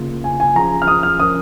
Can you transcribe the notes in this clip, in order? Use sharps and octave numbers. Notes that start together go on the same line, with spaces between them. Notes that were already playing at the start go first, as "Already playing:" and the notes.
Already playing: C#3 A#3 F4
G#5
G#5
F3 C#4 F4 G#4 A#5
F6
D#6
F6
F3 C#4 A#4 D#6